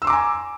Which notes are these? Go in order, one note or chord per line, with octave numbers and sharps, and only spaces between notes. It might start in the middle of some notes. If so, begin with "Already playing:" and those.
G#5 A#5 C6 D6 E6